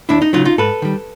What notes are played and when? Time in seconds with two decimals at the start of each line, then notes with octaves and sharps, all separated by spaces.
0.09 D#2 D4 E4
0.22 D#4
0.33 C#3 F#3 D#4 F4
0.45 D#4 F4
0.58 G#2 A4 B4
0.82 D#3 G3